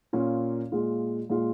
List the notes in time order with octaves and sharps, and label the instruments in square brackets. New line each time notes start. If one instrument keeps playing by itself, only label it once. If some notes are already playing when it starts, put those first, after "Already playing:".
[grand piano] A#2 A#3 C#4 F4
A#2 G#3 F4
A#2 G#3 F4